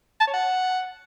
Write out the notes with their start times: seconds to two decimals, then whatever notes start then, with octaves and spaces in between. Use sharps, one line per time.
0.20 A5
0.27 C#5
0.34 F#5